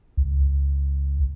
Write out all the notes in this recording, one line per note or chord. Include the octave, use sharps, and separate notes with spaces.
C#2